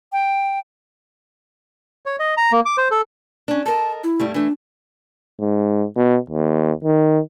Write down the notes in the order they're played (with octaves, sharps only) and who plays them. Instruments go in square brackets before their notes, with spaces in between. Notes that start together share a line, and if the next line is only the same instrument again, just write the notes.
[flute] G5
[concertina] C#5
D#5
A#5
A#3
D6
C5
A4
[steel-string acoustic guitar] C#4 D4
[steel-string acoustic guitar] A4 A#4 D#5 [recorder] A5
[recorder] E4
[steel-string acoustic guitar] G2 G3 A3
[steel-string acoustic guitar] E3 A3 [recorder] D4
[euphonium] G#2
B2
D#2
D#3